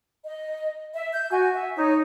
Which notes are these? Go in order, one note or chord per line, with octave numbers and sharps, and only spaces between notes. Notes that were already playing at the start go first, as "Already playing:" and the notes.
D#5
E5
G6
F#4 G#5
E5
D#4 C#5